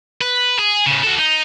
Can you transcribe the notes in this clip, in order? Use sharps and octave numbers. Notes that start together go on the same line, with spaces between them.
B4
G#4
A2 C#3
F#4 A4
D#4